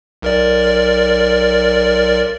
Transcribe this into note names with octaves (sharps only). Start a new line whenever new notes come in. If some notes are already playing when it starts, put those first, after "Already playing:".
B1 A#4 D5